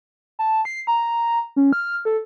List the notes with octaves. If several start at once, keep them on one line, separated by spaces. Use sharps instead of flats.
A5
C7
A#5
C#4
F6
A4